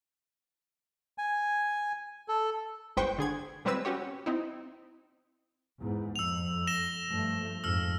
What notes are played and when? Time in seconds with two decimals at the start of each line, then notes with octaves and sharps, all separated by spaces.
1.18 G#5
2.28 A4
2.97 G1 G#3 B4 C5 G5 C#6
3.18 D3 G#4 G#6
3.65 A#2 G3 G#3 C4 B4 E6
3.85 C#4 F#4 G4 C#5
4.26 C4 D#4 E4
5.80 E2 G#2
6.16 F2 E6 F7
6.67 A#6 E7 G7
7.09 G2 F3 A3
7.64 F2 G#2 E6 F6